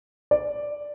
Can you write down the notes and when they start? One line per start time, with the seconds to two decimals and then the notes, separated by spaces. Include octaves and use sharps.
0.31 D5